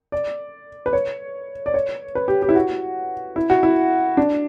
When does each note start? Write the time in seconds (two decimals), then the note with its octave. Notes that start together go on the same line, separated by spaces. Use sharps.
0.12 D5
0.86 B4
0.93 C#5
1.66 D5
1.74 C#5
2.15 B4
2.28 G4
2.42 G4
2.49 E4
2.55 F#4
3.36 E4
3.50 F#4
3.63 E4
4.17 D4